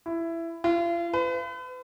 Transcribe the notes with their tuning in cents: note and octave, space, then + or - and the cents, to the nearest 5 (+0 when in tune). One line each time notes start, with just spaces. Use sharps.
E4 +15
F4 -40
B4 +40